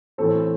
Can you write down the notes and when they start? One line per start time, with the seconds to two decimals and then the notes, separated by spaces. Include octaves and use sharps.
0.18 A2 E3 A3 C4 A4